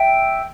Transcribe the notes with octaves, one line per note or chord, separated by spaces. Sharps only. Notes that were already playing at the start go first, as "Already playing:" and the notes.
Already playing: E5 G5